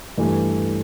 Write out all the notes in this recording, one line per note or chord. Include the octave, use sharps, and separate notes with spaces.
G2 E3 A3